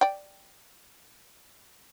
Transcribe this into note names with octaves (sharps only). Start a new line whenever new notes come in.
D5 G5